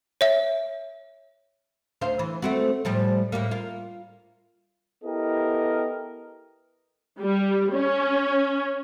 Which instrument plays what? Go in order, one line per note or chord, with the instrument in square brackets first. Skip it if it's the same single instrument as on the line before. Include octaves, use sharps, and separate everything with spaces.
[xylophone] C#5 E5
[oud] D2 C5 F5
E3
A3 C4 F#4
A2 F3 G3
A2 G3 A#3
F4 A#4
[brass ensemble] B3 E4 G4 A4 A#4 D#5
[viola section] G3
C#4